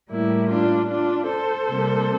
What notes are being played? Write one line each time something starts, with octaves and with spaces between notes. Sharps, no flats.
A2 G3 A#3 E4
D4 F4
D4 F4
A4 C5
C3 G3 A#3